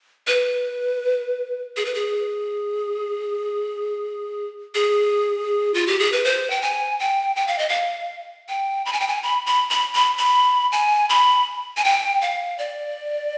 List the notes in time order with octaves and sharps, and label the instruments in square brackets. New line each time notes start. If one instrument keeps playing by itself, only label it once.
[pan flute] B4
G#4
B4
G#4
G#4
F4
G4
G#4
B4
C5
G5
G#5
G5
G5
F5
D#5
F5
G5
B5
G#5
G5
G#5
B5
B5
B5
B5
B5
G#5
B5
G#5
G5
F5
D5